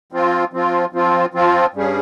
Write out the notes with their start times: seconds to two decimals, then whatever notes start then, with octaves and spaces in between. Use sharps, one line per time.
0.12 F3 C4 F4
0.53 F3 C4 F4
0.93 F3 C4 F4
1.34 F3 C4 F4
1.74 G2 G3 C#4 G#4